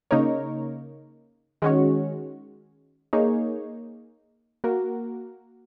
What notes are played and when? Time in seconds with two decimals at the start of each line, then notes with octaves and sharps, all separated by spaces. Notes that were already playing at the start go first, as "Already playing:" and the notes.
0.11 C#3 A#3 D#4 A#4 C#5
1.62 D#3 G#3 C#4 F#4 C#5
3.13 A#3 D#4 G#4 C#5
4.64 A#3 F#4 A#4